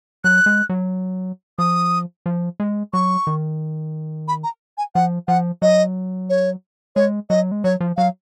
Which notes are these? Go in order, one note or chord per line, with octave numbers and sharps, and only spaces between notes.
F#3 F#6
G#3
F#3
F3 D#6
F3
G#3
F#3 C#6
D#3
B5
A#5
G#5
F3 F#5
F3 F#5
F#3 D#5
C#5
G#3 C#5
F#3 D#5
G#3
F#3 C#5
F3
F#3 F5